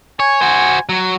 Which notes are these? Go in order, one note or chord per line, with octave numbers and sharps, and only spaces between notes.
C#5 G#5
F#4 C5
F#3